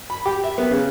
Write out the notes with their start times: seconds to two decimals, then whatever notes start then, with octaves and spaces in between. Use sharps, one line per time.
0.10 B5
0.26 G4
0.44 E5
0.58 B3
0.71 C#3